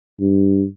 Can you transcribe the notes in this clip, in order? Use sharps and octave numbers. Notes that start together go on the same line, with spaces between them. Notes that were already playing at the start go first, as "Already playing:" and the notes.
G2